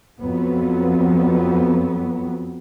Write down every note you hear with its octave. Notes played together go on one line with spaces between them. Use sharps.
F2 F#3 B3